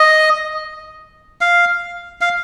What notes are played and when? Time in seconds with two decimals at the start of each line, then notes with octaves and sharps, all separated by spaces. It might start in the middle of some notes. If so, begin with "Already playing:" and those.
Already playing: D#5
1.41 F5
2.21 F5